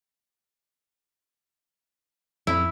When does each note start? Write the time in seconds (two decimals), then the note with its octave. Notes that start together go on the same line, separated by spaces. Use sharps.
2.47 F2 E4